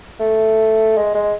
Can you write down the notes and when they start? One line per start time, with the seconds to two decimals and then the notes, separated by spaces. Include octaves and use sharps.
0.20 A3
0.98 G#3
1.15 G#3